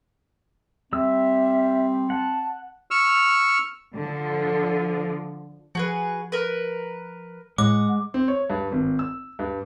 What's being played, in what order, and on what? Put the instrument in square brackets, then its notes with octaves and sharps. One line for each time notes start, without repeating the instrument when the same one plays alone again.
[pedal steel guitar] G3 E6 [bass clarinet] C4 [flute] E5
[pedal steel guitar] F#5 [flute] A5
[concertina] C#6 E6 F6
[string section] D3 F3
[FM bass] F3 [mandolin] F#4 G#4 B4
[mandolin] A#4 B4
[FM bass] A2 [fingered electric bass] G#3 [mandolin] F#5 [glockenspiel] D6
[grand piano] C4
C#5
G2
G#1
E6
G2